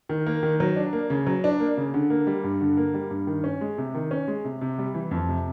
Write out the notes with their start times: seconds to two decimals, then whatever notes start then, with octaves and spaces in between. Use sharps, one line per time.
0.09 D#3
0.27 A#3
0.43 D#3
0.60 F#3
0.76 D4
0.93 A#3
1.10 C#3
1.27 F#3
1.44 D4
1.60 A#3
1.77 C#3
1.94 D3
2.10 A#3
2.27 G3
2.44 G2
2.61 D3
2.77 A#3
2.94 G3
3.11 G2
3.27 D#3
3.44 C#4
3.61 G#3
3.78 C3
3.94 D#3
4.11 C#4
4.28 G#3
4.45 C3
4.61 C3
4.78 G3
4.94 E3
5.11 F2
5.29 C3